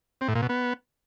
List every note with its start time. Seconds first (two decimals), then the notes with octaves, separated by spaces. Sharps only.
0.21 C4
0.28 A2
0.35 A#2
0.42 B2
0.49 B3